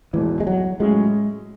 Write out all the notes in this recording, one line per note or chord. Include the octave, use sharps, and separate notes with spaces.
E1 E2 B2 E3
G#3
F#3
A2 F#3 G#3 C#4 G#4